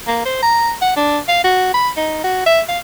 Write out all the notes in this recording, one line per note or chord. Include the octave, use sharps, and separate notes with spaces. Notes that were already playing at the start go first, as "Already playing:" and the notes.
A#3
C5
A#5
F#5
D4
F5
F#4
B5
D#4
F#4
E5
F5